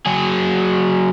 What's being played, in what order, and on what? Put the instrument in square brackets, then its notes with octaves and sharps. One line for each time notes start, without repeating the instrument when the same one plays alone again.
[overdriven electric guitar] F#3 G#4